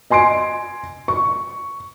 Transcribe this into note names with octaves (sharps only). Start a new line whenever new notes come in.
D#5 G#5 C6 C7 D7
C#6